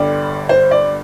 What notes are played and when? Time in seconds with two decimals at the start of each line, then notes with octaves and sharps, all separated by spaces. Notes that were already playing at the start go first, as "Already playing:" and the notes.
Already playing: G1 G2 D3 G3 D5
0.49 C5
0.71 D5